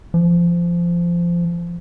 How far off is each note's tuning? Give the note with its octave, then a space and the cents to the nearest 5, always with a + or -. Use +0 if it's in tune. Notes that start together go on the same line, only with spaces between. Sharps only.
F3 -20